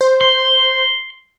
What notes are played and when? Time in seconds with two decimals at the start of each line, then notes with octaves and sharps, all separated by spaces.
0.01 C5
0.21 C6